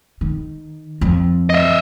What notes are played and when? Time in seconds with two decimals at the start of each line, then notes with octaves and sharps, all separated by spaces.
0.21 D#3
1.01 F2
1.50 D#5 E5